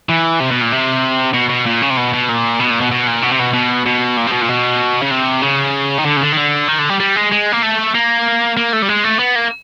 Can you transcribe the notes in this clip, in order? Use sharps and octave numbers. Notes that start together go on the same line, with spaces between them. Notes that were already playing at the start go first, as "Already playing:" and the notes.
E3
C3
B2
A#2
C3
B2
B2
A#2
C#3
C3
B2
B2
A#2
B2
A#2
B2
B2
A#2
B2
C3
B2
B2
B2
A#2
C3
B2
A#2
B2
C#3
C3
C#3
D#3
D3
C#3
D3
D#3
D3
D#3
D3
G3
G3
G#3
G#3
A#3
A3
A#3
A#3
A3
G3
G#3
A3
B3
A#3